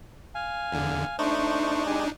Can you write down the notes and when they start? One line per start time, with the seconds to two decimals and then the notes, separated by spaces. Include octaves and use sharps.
0.35 F5 G#5
0.72 E2 D3
1.19 A3 D4 D#4 C5 C#6
1.86 G#3 G4 G#5